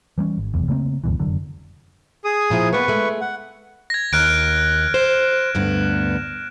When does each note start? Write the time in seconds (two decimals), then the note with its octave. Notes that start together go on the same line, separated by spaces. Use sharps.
0.18 E3 G3 A#3 C#4
0.38 G#1
0.54 F1 B1 E2
0.69 C#3 A3 A#3 C4
1.04 D2 G2 B2 E3
1.19 F1 F#2 D3 F#3
2.25 G#4 D#6
2.50 A#2 F3 E4
2.73 A#3 B3 B4 C#6
2.88 G#3 A3
3.21 F#5
3.90 G#6 A#6
4.13 D#2 F6 F#6 D7
4.94 C5 E7
5.55 D2 G2 B3